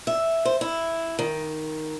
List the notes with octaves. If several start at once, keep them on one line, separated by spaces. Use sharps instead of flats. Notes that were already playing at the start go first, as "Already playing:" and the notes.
E5
C5
E4
D#3